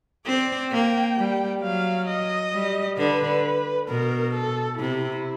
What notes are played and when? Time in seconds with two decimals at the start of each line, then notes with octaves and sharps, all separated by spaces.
0.26 C4 D5
0.72 A#3 G5
1.17 G3
1.62 F#3 F5
2.08 D#5
2.53 G3
2.98 D3 B4
3.88 B2 A#4
4.34 A4
4.79 C3 E4